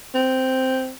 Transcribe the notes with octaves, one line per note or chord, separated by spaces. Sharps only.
C4